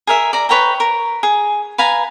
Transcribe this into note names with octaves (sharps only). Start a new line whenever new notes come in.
G#4 A#4 E5
D5 A#5
B4 C#5 G5 A#5
A#4
G#4
B4 F5 G#5 A#5